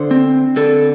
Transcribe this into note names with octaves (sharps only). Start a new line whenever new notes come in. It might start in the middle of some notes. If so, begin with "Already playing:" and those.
Already playing: D3 C5
C4
D3 A4